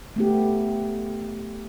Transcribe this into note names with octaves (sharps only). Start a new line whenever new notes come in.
A3 B3 G4